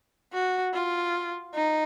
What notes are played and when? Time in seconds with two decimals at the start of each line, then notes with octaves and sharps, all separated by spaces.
0.33 F#4
0.74 F4
1.54 D#4